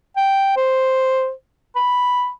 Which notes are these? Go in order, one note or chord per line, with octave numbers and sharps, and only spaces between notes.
G5
C5
B5